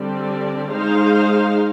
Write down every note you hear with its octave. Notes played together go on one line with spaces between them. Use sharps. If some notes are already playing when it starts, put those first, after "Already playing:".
Already playing: D3 G3 C4 G4 D5
G#3 D#4 G#4 C5 F5